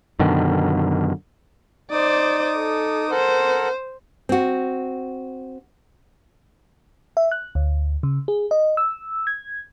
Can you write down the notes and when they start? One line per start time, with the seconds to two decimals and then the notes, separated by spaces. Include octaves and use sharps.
0.19 F#2 B2 D3 D#3
1.91 D#4 C5 D5 D6 D#6
2.57 A4
3.11 A4 A#4 C5 F#5
4.29 C4 F#4
7.17 E5
7.32 F#6
7.55 D2
8.03 C#3
8.28 G#4
8.51 D#5
8.77 E6
9.27 G#6